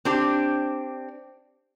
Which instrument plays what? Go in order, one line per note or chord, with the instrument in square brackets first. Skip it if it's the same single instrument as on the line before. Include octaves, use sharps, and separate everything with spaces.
[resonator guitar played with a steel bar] C4 D4 G4